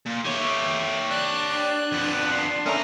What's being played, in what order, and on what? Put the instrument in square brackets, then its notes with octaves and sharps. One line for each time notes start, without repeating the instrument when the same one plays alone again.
[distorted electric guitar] A#2
[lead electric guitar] D#3 A3 [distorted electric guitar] G4 C#5
[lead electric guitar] D4 [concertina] D5 F#6
[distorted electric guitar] F2 B3
[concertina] C6
[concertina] A3 C#4 A#4 [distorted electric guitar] B3 A#5